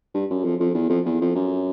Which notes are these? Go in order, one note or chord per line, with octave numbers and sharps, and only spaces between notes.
G2
F#2
F2
F2
E2
F2
E2
F2
F#2